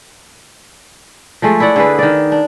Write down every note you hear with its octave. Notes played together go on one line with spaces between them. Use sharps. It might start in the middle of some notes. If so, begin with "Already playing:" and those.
F3 G#3 A3
E4 C#5 D5 F#5
D3 G#4 B4
D#3 D5
D4